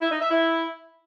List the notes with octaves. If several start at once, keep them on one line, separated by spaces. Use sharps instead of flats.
E4
D#4
E5
E4